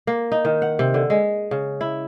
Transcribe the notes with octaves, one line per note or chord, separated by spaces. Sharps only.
A#3
D#4
D#3
F#5
C3
D3
G#3
C#3
E4